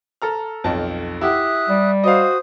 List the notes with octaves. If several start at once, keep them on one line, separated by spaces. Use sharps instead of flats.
A4 A#5 F6
B1 F2 A5
E4 G4 E5 F#5 D#6 F#6
G3
F#4 C5 D#5 F5 D#6